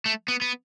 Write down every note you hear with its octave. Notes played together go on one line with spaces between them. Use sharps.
A3
B3
B3